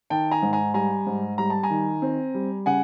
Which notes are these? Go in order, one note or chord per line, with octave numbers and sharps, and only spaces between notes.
D#3 G5 A5
G#5 A#5
G#2
G#5 A#5
G3 G#5 A#5
G#2
G3 A#5
A5
G#5 A#5
D#3
C4
G3
C#3 F#5 G#5